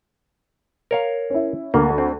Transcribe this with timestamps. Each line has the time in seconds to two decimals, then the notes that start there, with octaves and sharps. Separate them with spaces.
0.91 A#4 C#5 F5
1.30 C#4 E4
1.74 D2 A#3
1.98 C4